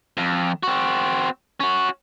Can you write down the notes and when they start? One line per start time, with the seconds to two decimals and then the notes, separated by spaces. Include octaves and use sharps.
0.17 F2
0.63 C4 F#4
1.60 C#4 F#4